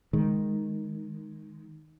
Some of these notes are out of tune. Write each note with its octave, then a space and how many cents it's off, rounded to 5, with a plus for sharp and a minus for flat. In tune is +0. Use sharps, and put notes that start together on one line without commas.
D#3 +0 G#3 +0